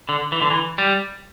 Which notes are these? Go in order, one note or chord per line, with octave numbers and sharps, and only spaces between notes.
D3
E3
D3
E3
G3